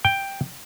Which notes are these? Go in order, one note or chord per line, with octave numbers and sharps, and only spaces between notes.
G5